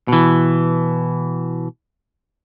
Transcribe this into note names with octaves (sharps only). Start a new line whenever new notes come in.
B2 E3